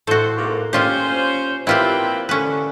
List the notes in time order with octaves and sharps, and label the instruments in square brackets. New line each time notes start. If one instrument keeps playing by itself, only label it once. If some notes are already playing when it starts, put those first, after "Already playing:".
[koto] A2 F#4 [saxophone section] A4 C5
[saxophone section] G#2 C3 A#3
[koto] A#2 F4 G4 [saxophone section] C#4 C5
[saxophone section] A#2 C4 B4 [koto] E4 F4 G4
[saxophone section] D3 [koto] C#4 B4